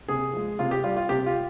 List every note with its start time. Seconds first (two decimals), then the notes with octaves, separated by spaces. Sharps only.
0.08 C3 G#4
0.33 F3 G#3
0.59 C3 F4
0.71 G4
0.84 G3 F4
0.97 F4
1.09 C3 G4
1.26 F4